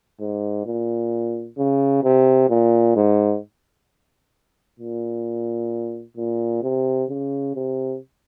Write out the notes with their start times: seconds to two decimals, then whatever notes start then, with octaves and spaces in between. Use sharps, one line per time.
0.20 G#2
0.66 A#2
1.58 C#3
2.03 C3
2.49 A#2
2.96 G#2
4.79 A#2
6.17 A#2
6.63 C3
7.09 C#3
7.55 C3